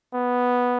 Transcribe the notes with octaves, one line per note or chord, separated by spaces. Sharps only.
B3